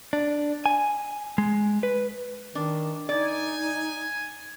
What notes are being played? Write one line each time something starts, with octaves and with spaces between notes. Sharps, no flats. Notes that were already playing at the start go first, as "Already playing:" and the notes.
D4
G#5
G#3
B4
D#3 D4
D#4 D5 G#5